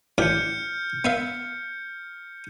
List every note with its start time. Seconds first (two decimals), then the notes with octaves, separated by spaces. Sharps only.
0.18 A1 E3 D6 F6 G6 C#7
1.05 B3 E5 F5